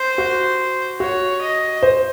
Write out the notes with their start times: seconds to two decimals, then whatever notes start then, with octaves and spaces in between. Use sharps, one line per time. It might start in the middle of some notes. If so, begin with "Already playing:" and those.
Already playing: C5
0.18 F#4
1.00 F#4 C#5
1.41 D#5
1.83 C5